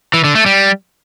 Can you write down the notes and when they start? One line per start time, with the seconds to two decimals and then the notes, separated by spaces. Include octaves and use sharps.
0.14 E3
0.24 D3
0.35 A3
0.46 G3